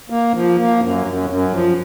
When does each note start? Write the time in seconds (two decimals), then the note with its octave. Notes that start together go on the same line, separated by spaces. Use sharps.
0.10 A#3
0.34 F3
0.58 A#3
0.82 F#2
1.06 F#2
1.30 F#2
1.54 F3